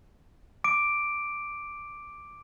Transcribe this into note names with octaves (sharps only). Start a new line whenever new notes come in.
D6 D7